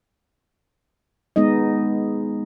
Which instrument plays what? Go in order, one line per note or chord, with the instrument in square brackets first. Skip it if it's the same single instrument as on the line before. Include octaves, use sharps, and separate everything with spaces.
[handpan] G#3 B3 D#4 D#5